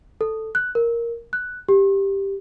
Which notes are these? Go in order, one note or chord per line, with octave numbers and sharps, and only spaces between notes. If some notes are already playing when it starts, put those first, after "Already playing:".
A4
F#6
A#4
F#6
G4